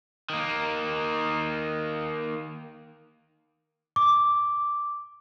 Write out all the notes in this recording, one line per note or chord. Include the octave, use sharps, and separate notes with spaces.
D#3 A#3
D6